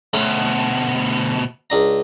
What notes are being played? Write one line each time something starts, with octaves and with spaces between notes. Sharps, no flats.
D2 B2 A3 C#4
C#2 D4 A#5